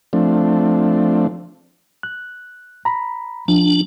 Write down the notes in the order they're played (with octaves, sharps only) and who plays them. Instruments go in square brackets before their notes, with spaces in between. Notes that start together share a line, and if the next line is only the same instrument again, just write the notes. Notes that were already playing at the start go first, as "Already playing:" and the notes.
[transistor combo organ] F3 A3 C4 D4
[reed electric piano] F#6
A#5 B5
[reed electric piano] F3 [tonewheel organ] D4